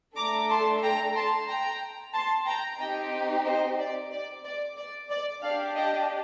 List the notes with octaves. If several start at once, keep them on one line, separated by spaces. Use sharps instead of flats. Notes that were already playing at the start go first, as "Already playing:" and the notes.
A3 D4 A4 A#5 D6
A5 C6
G5 A#5
A5 C6
G5 A#5
A5 C6
G5 A#5
C4 D#4 G4 D#5 G5
C5 D#5
D5
D5
D5
D5
D5
D4 G4 D5 F5
D#5 G5